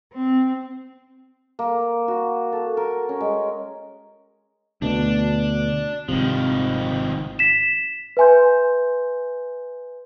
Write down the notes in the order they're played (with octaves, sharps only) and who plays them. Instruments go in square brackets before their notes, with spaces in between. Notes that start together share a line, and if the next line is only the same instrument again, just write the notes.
[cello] C4
[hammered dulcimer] A#3
F#4
A4
A#4
C#4
G#3
[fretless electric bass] D2 B2 [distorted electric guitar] D4
[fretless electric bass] G#1 C3 [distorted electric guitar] D#3 F3
[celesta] B6 E7
B4 E5 G#5 C6 G6